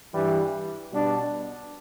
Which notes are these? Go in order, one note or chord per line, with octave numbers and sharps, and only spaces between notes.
G2 E3 G3
B2 G3 D4